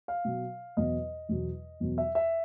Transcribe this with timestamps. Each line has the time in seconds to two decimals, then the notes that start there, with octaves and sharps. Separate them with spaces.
0.08 F5
0.25 B2 F#3
0.77 E2 B2 F#3 D#5
1.29 E2 B2 F#3
1.80 E2 B2 F#3
1.98 E5
2.15 E5